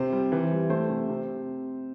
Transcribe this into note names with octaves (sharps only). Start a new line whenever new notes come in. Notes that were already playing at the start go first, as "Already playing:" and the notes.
Already playing: C3 C5
G3
E3
G3
A3 C5
C3
C3